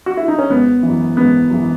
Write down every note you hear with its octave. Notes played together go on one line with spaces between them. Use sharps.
F#4
E4
D#4
C#4
G#1 B3
E3
F#2
G#1 B3
F#2 E3